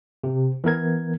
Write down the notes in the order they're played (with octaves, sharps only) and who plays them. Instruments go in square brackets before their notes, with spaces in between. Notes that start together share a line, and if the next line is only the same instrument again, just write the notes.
[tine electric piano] C3
E3 B3 A#4 G#6